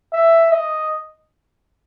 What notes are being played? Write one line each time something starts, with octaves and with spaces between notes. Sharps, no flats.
E5
D#5